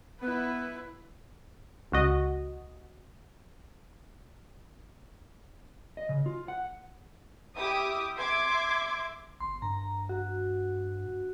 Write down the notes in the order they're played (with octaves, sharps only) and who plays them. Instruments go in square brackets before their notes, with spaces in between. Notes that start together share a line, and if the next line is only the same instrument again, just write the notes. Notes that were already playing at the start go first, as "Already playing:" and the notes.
[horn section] B3 [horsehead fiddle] E4 B4
[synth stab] C#2 F#4 D#5
[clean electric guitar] D#5
C#3
F4
F#5
[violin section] E4 G4 E5 D6 D#6
E5 C6 D6 G#6
[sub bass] G1 [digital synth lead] C6
[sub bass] G2 [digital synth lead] A#5
[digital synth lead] F#4